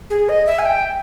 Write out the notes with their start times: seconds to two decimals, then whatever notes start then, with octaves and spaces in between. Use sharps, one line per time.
0.10 G#4
0.29 D#5
0.47 E5
0.59 G#5
0.65 G5